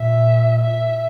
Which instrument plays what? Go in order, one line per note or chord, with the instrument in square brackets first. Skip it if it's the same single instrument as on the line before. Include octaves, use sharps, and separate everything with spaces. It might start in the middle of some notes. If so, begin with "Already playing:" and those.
Already playing: [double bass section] A#2 [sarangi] E5
[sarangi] E5